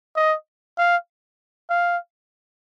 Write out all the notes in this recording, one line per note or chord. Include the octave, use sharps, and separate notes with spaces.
D#5
F5
F5